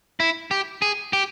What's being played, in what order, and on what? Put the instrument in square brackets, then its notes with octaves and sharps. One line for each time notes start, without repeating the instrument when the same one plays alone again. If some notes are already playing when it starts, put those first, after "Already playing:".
[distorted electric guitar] E4
G4
G#4
G4